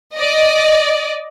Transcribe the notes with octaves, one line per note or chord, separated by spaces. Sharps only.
D5 D#5